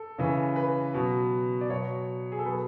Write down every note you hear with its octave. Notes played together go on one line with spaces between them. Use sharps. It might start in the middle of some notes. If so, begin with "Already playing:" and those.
Already playing: A4
C#3 E3
B4
B2 F#3
D5
B2 F#3 C#5
G#4
A4
B2 F#3 B4